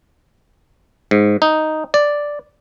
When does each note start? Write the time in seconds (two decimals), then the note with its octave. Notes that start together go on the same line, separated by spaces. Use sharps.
1.11 G#2
1.42 D#4
1.94 D5